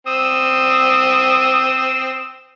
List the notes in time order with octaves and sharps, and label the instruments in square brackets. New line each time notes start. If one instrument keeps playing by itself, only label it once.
[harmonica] C4 D#6 E6